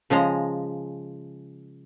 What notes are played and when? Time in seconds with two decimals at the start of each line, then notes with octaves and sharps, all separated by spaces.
0.10 C#3 F3 G#3 A#5